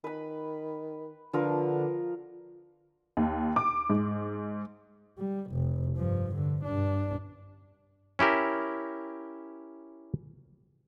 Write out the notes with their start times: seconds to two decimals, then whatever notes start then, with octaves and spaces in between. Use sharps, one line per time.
0.04 D#3 B4 B5
1.33 D3 F3 A#4 B4
3.17 D#2
3.56 D6
3.90 G#2
5.18 G3
5.52 F1
5.97 G2 F3
6.35 D3
6.64 G2 D4
8.19 C#4 E4 G4 A#4